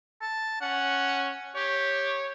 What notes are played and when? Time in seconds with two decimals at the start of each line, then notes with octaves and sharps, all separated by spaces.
0.22 A5
0.61 C#4 F#5
1.56 G4 C#5